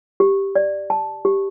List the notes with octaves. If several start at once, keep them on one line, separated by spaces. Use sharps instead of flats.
G4
D5
A5
G4